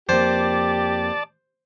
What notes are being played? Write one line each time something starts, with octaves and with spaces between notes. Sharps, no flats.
F2 A#3 G4 C5 D5 A5